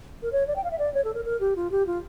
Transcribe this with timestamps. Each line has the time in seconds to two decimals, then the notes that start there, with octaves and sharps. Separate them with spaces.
0.22 A#4
0.32 C#5
0.47 D5
0.56 G5
0.64 F5
0.71 E5
0.79 D5
0.94 C#5
1.04 A4
1.14 A#4
1.25 A#4
1.40 G4
1.56 F4
1.71 G4
1.87 F4